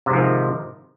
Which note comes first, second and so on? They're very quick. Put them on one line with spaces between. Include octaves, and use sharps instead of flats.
C3 G#2 F3 D#3